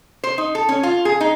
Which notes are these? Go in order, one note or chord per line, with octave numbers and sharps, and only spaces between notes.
C5
D#4
A4
C#4
F4
G#4
D#4